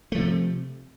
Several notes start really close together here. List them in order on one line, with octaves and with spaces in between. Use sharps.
A3 F3 C3